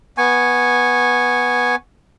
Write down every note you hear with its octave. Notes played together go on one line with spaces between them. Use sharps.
B3 G#5 C#6